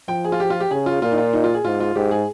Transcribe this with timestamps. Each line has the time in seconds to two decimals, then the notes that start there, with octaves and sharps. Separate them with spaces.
0.08 F3 G5
0.24 G#4
0.32 F4
0.40 G4
0.50 F4
0.60 G4
0.71 C#3 G#4
0.86 F4
1.02 A#2 F4
1.12 D#4
1.18 F4
1.33 D#4
1.44 F4
1.54 G#4
1.65 G#2 F4
1.80 F4
1.95 G#2 G4
2.11 G#4